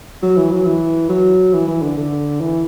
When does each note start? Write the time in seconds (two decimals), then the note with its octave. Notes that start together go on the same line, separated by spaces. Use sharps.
0.22 F#3
0.36 E3
0.51 F#3
0.65 E3
1.09 F#3
1.53 E3
1.67 E3
1.82 D3
1.97 D3
2.40 E3